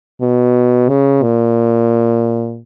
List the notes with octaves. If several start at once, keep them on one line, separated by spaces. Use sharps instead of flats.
B2
C#3
A#2